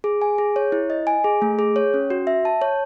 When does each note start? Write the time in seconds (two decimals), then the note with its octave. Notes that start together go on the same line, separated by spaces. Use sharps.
0.04 G#4
0.22 G#5
0.38 G#4
0.56 C#5
0.72 E4
0.90 D#5
1.07 G#5
1.24 G#4
1.42 A3
1.59 G#4
1.76 C#5
1.94 C#4
2.10 F#4
2.27 E5
2.45 A5
2.62 C#5